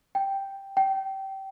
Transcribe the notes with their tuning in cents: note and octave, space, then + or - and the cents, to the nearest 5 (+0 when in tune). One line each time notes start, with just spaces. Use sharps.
G5 +0
G5 -20